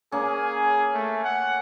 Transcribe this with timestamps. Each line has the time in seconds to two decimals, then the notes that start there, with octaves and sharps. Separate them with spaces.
0.12 A#3 C#4 G#4
0.94 A3
1.24 F#5